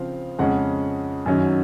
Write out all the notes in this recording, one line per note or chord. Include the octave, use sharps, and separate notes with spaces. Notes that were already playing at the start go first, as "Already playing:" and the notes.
Already playing: C#3 F3 C4 F4 F5
F2 C#3 G#3 C#4 F#5
F#2 D#3 F#3 C#4